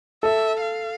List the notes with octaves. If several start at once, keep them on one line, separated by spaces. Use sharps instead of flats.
A4 E5
F5